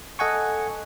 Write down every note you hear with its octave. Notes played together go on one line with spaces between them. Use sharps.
A4 D#5 F#5 G#5 C#6